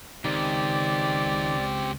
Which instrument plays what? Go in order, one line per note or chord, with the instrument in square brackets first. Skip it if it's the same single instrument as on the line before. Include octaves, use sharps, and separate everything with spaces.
[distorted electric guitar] C#2 [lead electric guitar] D#3 [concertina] C4 G4 [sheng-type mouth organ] D5